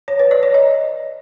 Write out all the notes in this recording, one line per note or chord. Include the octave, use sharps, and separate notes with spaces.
C#5
B4
D5
C#5
D#5